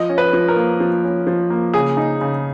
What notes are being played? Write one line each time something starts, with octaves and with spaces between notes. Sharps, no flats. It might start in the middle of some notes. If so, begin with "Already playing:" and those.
Already playing: F3 D#5
C#4
B4
F3
A#4
A#3
F3
C#4
F3
A#3
C#3 G#4
D#4
C#3